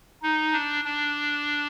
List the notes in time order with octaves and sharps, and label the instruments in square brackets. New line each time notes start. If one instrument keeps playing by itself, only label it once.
[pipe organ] D#4
D4
D4